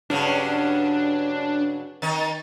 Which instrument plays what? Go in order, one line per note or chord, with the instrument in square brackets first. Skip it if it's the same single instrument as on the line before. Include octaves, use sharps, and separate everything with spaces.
[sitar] G2 C#3 F#3 [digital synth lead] D4
[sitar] D#3 D#4 [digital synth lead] A6